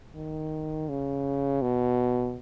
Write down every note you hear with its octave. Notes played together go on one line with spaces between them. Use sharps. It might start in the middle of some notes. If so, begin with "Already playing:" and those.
D#3
C#3
B2